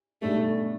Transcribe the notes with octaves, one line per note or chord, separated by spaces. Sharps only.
B1 B2 G3 A3 D4 A4